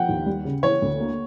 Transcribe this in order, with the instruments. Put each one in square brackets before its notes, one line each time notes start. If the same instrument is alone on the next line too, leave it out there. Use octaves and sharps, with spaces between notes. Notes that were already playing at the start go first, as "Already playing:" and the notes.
Already playing: [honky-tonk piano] F3 [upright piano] F#5 G5
[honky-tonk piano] D#2
G3
C#3
[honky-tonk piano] E3 [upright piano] C#5
[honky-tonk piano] D2
A#3